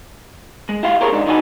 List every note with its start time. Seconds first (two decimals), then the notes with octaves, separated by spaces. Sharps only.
0.69 G#3
0.83 E4 G4 F5
1.01 G4 G#4 A#4 C#5
1.13 G#2 D4 D#4
1.26 D#3 D#4 F#4 C5 G#5